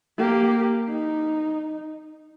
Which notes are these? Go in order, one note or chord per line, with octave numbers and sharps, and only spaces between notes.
A#3 G4
D#4